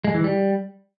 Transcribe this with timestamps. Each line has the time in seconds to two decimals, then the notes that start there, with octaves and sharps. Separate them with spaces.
0.04 G#3
0.14 E3
0.24 G3